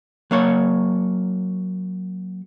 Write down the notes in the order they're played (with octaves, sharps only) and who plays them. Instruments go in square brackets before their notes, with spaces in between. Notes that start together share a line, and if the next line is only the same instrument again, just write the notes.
[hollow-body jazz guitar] F#3 A#3 C#5